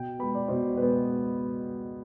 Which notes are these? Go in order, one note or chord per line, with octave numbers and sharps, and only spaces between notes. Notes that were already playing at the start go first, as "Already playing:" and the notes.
Already playing: B2 G5
G#3 B3 B5
D5
B2 C5
G#3 B3 B4